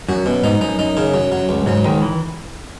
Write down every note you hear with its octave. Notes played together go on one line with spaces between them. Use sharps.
F#2 F#4
F#2 B2
G#2 D#4
F#2 D#4
F#2 D#4
C#3
F#3
F#3
C#2
G#2 F#3
C#2 D#3
E3